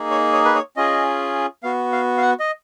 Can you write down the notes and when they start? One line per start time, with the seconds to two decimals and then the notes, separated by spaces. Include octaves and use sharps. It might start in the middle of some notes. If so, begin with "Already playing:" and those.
Already playing: A#3 D#4 G#4
0.11 C#5
0.33 C#5
0.45 B4
0.55 C#5
0.77 C#4 F4 G#4 D#5
1.63 B3 F#4 F5
1.92 F5
2.17 F5
2.22 F#5
2.40 D#5